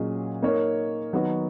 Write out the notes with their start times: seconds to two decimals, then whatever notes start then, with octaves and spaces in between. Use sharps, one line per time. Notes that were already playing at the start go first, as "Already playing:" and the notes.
Already playing: A#2 F#3 C#4 G#4 D#5
0.42 A#3 D#4 A#4 C#5
1.13 D#3 F#3 B3 D#4 F#4